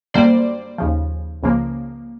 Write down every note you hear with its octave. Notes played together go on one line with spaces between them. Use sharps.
F#2 D3 G3 A#3 C5 D5
D#2 C#3 F3
C#2 C#3 F3 A#3